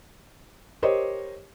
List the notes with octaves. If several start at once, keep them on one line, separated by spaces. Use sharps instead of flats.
G4 A#4 C5 C#5 D#5